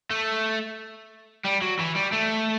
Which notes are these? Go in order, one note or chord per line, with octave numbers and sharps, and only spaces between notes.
A3
G3
F#3
E3
G3
A3